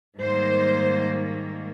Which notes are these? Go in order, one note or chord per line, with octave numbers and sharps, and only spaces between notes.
G#2 D#3 G3 A#3 C5